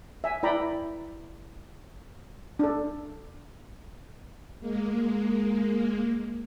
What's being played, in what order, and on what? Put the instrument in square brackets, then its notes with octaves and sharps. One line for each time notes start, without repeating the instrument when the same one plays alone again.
[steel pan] E5 G#5
E4 D5 G5 A#5 B5
D4 A4
[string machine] G#3 A#3